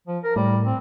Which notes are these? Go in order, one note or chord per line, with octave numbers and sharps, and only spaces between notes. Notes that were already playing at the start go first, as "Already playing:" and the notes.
F3
A#4
A2 G3
C4